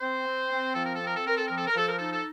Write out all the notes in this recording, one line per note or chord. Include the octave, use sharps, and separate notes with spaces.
C4 C5
C4
C4
F3 A4
A#4
A4
C4
A#4
A4
C4 A#4
A4
F3 A#4
A4
A#4
F3 A4
A#4
D#4 A4
A4